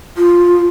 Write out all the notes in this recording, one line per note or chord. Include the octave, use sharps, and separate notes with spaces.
F4